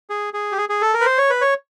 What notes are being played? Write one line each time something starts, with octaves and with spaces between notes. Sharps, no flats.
G#4
G#4
G4
G#4
G#4
A4
A#4
B4
C5
C#5
B4
C#5